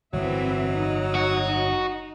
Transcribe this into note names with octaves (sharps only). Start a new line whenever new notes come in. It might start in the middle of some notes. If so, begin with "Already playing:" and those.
G1 A2 E3 F#3 C4 E5
D#4
F#4